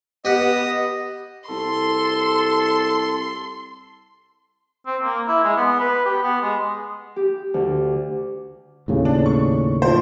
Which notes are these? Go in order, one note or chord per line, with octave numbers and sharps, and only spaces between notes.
B3 G4 D#5 F#5 D#6
C2 A4 C6
C4
A#3
E4
G#3
B3
B4
G4
B3
G#3
G4
D2
D#2 A2 C#3
D4
C#6
F3 C5